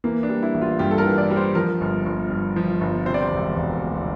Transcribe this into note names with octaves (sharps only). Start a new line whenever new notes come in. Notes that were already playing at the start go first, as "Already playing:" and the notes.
E3 A#3
D4
G3
E4
A1
F4
G2 G4
A4
A#4
E3
D5
G3
C5
F3 A#4
G1
G1
G2
F3
G1
C3 C5
D5
C5
E1
E1
D2